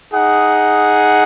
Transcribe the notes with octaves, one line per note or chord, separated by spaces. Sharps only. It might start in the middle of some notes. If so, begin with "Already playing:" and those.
D#4 G#4 F#5